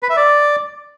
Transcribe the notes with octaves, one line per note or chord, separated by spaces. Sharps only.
B4
E5
D5